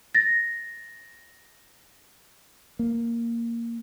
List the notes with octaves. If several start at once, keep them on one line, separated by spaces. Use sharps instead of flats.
A6 A#6
A#3